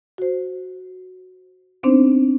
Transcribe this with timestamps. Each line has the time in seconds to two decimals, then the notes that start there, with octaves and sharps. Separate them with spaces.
0.18 F#4 C5
1.83 B3 C4 D4 D#4 C5